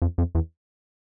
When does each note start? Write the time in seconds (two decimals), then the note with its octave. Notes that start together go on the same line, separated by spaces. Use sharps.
0.02 F2
0.18 F2
0.35 E2